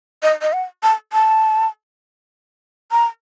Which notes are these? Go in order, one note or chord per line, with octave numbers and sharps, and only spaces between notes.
D#5
D#5
F#5
A5
A5
A#5